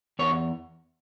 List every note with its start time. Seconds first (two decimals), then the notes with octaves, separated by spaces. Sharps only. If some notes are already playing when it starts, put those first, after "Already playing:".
0.19 E2 C#5